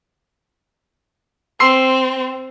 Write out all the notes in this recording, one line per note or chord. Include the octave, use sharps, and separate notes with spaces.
C4 C6 E6 C7